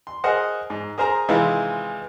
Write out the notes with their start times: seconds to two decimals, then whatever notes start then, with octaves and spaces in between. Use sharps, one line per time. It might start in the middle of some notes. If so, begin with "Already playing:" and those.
0.07 C6
0.24 G#4 A#4 C5 D#5 F#5
0.70 G#2
0.98 G#4 A#4 C5 G#5 A#5
1.28 C3 D#3 E3 G#3 E4 F4